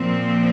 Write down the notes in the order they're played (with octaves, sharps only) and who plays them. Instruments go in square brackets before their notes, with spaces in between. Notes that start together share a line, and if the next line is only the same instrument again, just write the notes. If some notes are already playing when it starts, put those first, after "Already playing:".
Already playing: [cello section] A#2 F3 C4